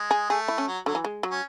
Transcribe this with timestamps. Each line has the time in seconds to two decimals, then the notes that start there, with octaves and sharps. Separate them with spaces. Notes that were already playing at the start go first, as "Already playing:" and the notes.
Already playing: G#3
0.11 G#4
0.30 A3 G#4
0.48 E4
0.58 C#4
0.68 F#3
0.86 D3 F#3
0.95 E3
1.04 G#3
1.23 F#3
1.31 C#4